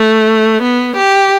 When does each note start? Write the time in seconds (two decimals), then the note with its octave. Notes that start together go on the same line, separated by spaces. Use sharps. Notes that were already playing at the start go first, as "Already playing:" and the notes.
Already playing: A3
0.63 B3
0.97 G4